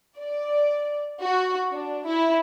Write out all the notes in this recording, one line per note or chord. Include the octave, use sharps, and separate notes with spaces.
D5
F#4
D4
E4